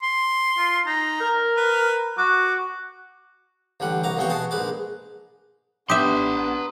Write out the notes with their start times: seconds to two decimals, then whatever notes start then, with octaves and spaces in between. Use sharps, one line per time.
0.02 C6
0.58 F4
0.86 D#4 A#5
1.21 A#4
1.57 B4
2.18 F#4 D6
3.80 A1 D3 G3 F#5
4.04 C2 F#4 A#5 D6
4.17 A1 C3 F3 B3 G5 C#6
4.30 B2 F#4 G#4 A5
4.51 A#1 G#2 G#3 B4 D6
5.90 B3 D4 G4 B4 E5 C6 D#6